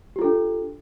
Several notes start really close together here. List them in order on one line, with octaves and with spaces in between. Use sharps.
G4 F4 A4 D4